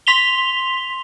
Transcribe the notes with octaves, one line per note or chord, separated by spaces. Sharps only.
C6 B6 F7 G7